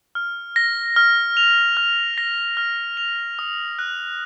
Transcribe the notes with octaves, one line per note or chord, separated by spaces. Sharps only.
F6
A#6
F6
F7
F6
A#6
F6
F7
D#6
F#6